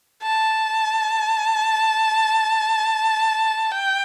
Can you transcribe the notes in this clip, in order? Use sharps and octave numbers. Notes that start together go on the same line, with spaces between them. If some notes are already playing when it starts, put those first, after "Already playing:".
A5
G5